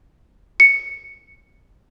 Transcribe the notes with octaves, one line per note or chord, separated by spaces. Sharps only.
C#7